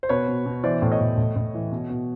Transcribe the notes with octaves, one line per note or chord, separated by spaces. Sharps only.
C5
B2 B4 C#5
B2
B2
E3 C5 D5
A2
C#5 D#5
A2
A2
A2
E3
B2
B2